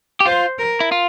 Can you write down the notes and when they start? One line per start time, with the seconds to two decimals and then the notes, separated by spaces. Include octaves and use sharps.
0.20 G4
0.26 F4 C5
0.59 A#4
0.80 E4
0.92 F4